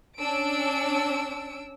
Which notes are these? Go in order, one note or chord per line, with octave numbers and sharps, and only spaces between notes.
C#4 D4 E6 D7